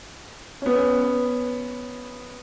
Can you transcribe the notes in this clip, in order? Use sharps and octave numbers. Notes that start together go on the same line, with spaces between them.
B3 C#4